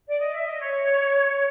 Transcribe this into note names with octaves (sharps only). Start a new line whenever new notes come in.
D5
D#5
E5
D#5
C#5